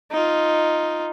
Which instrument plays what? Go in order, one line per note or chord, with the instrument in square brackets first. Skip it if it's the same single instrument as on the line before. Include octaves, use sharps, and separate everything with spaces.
[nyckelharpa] D#4 F4